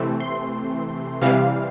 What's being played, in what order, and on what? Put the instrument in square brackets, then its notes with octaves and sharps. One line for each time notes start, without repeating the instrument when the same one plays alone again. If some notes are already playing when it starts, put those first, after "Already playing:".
Already playing: [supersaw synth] C3 E3 A3 C4
C6
C3 E3 G3 F5